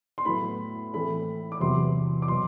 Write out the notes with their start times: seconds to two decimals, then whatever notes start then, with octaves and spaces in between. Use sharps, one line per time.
0.18 C6
0.25 A2 F#3 B3 B5
0.93 A2 E3 A3 C4 B5
1.52 D6
1.60 E2 C3 F#3 B3 C6
2.22 D6
2.28 B2 F#3 C6